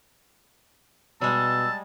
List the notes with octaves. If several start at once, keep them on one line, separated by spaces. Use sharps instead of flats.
B2 G3 G#3 A5 E6